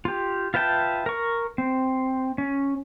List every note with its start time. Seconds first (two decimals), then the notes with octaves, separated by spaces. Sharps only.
0.05 F4 G4
0.54 F4 B4 E5 G5 A5
1.06 A#4 C#6
1.58 C4
2.38 C#4